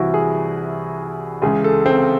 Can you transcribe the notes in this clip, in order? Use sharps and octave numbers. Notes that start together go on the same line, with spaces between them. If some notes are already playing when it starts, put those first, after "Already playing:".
Already playing: C2 C3 E3 E4 F#4
G#4
C#2 C#3 E3 G#4
A4
C4